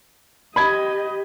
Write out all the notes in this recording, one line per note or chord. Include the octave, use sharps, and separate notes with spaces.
G4 D#5 B5 G#6